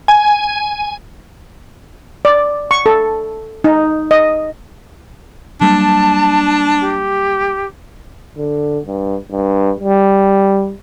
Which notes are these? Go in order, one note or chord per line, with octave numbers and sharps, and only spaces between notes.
G#5
D5
C#6
A4
D#4
D#5
F#3 G3 A#3 D4 A5
G4
D3
G2
G2
G3